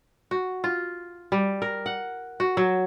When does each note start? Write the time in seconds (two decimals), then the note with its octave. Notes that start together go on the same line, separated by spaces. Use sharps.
0.31 F#4
0.64 F4
1.32 G3
1.62 A#4
1.86 F#5
2.40 F#4
2.57 F#3